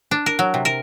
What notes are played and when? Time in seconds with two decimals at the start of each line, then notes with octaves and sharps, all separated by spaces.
0.11 D4
0.26 A#4
0.39 F#3
0.54 C3
0.65 A#4